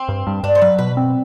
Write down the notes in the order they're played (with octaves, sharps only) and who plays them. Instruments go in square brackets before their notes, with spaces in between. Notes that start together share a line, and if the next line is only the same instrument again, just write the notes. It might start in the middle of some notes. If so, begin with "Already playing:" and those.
Already playing: [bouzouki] C4
[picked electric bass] G2
G2
[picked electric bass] G2 [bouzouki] D4
[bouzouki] C5
[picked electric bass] F#3 [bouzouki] B4
[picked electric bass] B2 [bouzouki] B4
[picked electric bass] C4